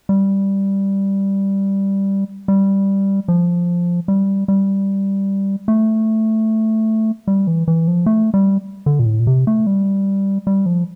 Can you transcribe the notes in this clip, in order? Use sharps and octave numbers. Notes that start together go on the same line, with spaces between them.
G3
G3
F3
G3
G3
A3
G3
E3
E3
F3
A3
G3
D3
A#2
A2
A#2
C3
A3
G3
G3
F3